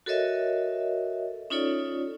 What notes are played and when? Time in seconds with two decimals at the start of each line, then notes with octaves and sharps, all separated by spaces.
0.06 F#4 A4 A#4 C#5 D#5 E5
1.50 C#4 D#4 F4 A4 C#5 D5